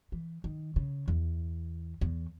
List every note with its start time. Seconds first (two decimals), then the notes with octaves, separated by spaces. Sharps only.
0.12 E3
0.44 D#3
0.76 C#3
1.08 E2
2.01 E2